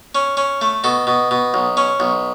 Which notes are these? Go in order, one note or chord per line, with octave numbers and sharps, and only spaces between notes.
C#4
C#4
A3
B2 A4
B2
B2
B1
C#4
B1